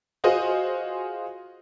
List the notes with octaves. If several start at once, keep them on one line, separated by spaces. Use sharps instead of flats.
F4 F#4 G#4 C5 D#5